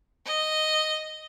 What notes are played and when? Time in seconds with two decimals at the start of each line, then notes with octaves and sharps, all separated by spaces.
0.26 D#5